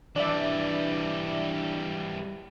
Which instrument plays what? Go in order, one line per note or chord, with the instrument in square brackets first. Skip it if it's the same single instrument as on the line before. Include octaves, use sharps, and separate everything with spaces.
[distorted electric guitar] E3 G3 [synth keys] D4 D5 E5